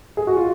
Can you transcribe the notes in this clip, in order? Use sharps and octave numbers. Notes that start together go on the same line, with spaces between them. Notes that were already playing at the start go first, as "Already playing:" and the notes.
G#4
F#4
F4